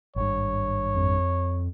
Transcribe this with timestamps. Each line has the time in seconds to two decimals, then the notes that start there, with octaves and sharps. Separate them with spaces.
0.16 G#1 G2 C#5
0.95 F2